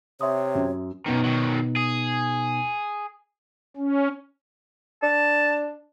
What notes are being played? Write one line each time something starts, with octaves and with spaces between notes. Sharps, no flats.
C3 C#5 E5 C6 D#6
F#2
F#2 B2 D#3 B3 D#4
D#3 F#3
G#4
C#4
D4 A5